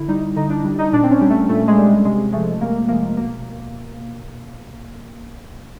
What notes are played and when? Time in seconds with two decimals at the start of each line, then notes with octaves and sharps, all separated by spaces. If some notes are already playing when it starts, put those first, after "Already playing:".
Already playing: D3 E4
0.08 G3 D#4
0.36 D3 D#4
0.50 D4
0.64 G3
0.79 D#4
0.93 A#2 D4
1.03 C4
1.11 C#4
1.21 G3
1.30 A3
1.49 A#2 A3
1.68 G#3
1.77 G3
2.05 C3 G#3
2.32 F3 G#3 A3
2.61 C3 A#3
2.89 F3 G#3 A#3
3.17 B2 A#3